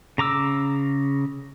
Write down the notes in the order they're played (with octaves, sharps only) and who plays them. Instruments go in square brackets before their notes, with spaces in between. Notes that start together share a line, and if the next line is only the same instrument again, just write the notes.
[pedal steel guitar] C#3 A#5 D6 E6